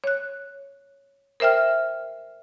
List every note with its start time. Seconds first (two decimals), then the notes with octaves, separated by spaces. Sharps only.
0.04 C#5 F#6
1.40 A#4 C5 E5 G5 F6